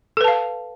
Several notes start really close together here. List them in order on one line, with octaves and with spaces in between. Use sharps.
A4 B4 A5 F5